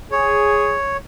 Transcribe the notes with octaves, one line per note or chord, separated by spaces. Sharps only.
G#4 C#5